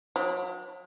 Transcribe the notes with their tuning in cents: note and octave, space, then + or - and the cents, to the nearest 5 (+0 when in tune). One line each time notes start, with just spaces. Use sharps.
F#3 -40